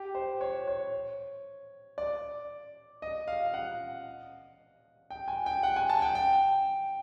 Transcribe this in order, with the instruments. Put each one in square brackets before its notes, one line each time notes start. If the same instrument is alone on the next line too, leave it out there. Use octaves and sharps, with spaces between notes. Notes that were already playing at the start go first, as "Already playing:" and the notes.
Already playing: [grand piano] G4
C5
C#5
C#5
D5
D#5
F5
F#5
G5
G#5
G5
F#5
G#5
A5
G5
G5